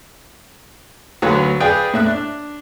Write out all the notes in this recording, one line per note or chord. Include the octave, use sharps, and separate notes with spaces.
D2 F#3 B4 C#5 F5
G#4 B4 D5 F5 G5
A2 E5 F#6
D4